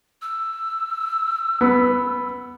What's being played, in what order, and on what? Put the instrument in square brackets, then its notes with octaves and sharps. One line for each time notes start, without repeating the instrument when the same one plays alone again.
[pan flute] E6
[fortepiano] B3